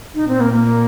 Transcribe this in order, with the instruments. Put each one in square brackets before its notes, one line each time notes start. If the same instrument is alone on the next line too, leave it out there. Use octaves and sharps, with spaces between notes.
[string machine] A#2 [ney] D#4
[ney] C4
A#3
A#3